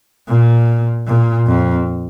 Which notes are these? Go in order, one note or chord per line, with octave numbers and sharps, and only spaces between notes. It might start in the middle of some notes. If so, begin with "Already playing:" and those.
A#2
A#2
F2